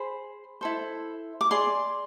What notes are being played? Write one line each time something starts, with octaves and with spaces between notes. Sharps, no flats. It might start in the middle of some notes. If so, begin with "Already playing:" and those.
Already playing: G#4 C5 B5
E4 A4 C5
D6
G#4 D5 C6